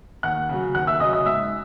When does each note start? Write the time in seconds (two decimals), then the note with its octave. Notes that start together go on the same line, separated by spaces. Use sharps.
0.23 D#2 F#5 F#6
0.49 C#3 F#3
0.74 D#2 F#5 F#6
0.87 E5 E6
1.00 C#3 D#5 D#6
1.05 F#3
1.13 D#5 D#6
1.25 G#2 E5 E6